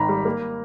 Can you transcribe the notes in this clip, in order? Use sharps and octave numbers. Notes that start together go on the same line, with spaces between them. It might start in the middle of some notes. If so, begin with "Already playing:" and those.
Already playing: G#1 D#3 A#5 B5
G3
A#3